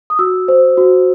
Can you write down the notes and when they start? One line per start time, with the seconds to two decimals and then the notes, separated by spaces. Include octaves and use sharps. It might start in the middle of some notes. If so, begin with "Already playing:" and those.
0.10 D#6
0.19 F#4 E6
0.48 C5
0.77 F#4